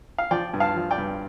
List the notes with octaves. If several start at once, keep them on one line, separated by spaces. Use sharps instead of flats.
F5
F3 D5 G5
G2
F5 A5
F3
D5 G5
G2